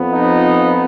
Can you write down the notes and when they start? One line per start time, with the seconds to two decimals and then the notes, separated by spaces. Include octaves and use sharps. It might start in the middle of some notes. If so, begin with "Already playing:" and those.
Already playing: F2 F3 B3
0.11 D#4